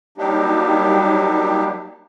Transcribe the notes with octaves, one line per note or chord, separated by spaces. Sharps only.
F#3 G3 A#3 D4 D#4 G4